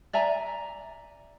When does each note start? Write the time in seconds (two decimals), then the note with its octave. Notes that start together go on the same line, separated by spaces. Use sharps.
0.13 D5 E5 G#5 A#5